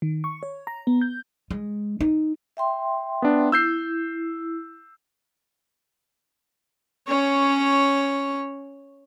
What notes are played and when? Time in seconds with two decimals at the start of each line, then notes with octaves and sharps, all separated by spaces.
0.02 D#3
0.24 C#6
0.43 C#5
0.67 A#5
0.87 B3
1.01 G6
1.51 G#3
2.01 D#4
2.57 E5 G5 C6
3.22 B3 D4
3.52 E4 E6 G6 C7
7.07 C#4 C#5